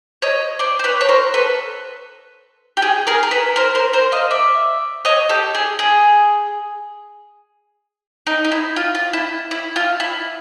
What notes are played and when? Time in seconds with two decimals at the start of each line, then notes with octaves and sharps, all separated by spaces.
0.22 C#5 D#5
0.59 C5 D5
0.79 C5
0.84 B4 C#5
1.01 C#5
1.09 A#4 C5
1.34 A4 B4
2.77 G4
2.82 G#4
3.07 G#4 A#4
3.23 A#4
3.31 A4 B4
3.56 A#4 C5
3.75 A#4 C5
3.93 A#4 C5
4.12 D#5 F5
4.31 D5 E5
5.05 C#5 D#5
5.29 G4 A4
5.55 G#4
5.79 G#4
8.27 D#4
8.45 D#4
8.52 E4
8.76 F4
8.95 F4
9.13 E4
9.51 E4
9.76 F4
10.00 E4